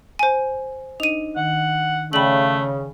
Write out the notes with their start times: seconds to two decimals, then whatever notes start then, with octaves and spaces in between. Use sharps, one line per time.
0.19 C5 G#5
1.00 D4 D#4 D#5 D#7 F7
1.36 D#3 F#5
2.13 C#3 A3 D5 G5 G#5 B5 F#7